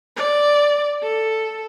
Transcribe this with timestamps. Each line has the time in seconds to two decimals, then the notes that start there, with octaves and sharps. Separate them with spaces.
0.17 D5
1.03 A4